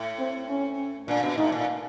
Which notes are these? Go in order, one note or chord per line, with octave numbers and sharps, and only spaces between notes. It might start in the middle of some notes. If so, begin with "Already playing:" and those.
Already playing: A2
C4
C#4
A#2 D4
B2
A2 D#4
A#2